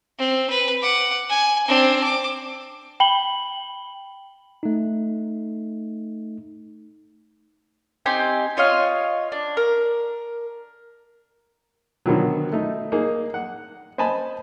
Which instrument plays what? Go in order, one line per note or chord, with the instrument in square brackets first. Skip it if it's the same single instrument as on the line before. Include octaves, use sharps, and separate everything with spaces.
[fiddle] C4
B4
F#5 D6
G#5
C4 D4
D6
[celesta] G5 B5 F#7 G7
[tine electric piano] A3 D#4
[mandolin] C4 D#4 G4 G#5
F4 C#5 D#5 F5
D4
A#4
[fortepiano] B2 D3 D#3 F3 F#3
A3 D#4
A#3 D#4 G#4
F#5
C5 D#5 G#5 A5 B5